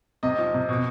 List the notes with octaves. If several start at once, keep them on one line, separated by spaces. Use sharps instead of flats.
C3 D#5
F3
C3
B2